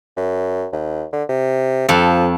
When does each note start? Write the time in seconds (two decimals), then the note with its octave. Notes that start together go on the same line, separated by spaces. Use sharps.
0.17 F#2
0.73 D#2
1.13 D3
1.29 C3
1.89 F2 F3 A4